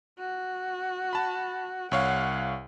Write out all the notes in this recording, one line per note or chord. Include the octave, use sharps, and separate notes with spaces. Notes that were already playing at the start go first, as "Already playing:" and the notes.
F#4
A5 B5
C2 C#5 F5 F#5